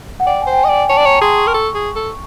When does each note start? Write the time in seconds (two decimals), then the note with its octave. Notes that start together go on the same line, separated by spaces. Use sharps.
0.20 F#5
0.26 D5 G5
0.42 C5 G#5
0.53 G5
0.58 G#5
0.64 D#5
0.69 D5
0.74 G#5
0.89 C#5 A5
0.97 D5
1.06 C#5 A#5
1.15 C#6
1.21 G#4 C6
1.38 C#6
1.47 A#4
1.54 A4 C#6
1.75 G#4
1.96 A4